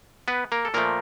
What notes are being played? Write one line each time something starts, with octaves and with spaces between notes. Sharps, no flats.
B3 B4
A#3 A#4
A4
A#2 F3 A3 A#3 A#4